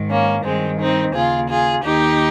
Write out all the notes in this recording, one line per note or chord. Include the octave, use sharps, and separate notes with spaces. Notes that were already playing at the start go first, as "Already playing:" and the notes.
Already playing: G#2 D#3
A#3 C#4
G2 D#3 G#3 C4
C4 D#4
D#2 C#3 F4 G#4
F4 G#4
D#2 D#3 D#4 G4